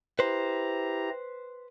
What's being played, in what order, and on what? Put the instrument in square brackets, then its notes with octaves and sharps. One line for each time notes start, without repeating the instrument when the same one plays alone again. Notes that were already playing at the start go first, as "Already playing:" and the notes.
[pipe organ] E4 G4 A#5 [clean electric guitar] B4 C5